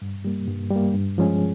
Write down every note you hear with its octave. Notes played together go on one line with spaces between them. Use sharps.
G2
G3 A#3
G2
G3 A#3
G2
F3 G#3 C#4 G#4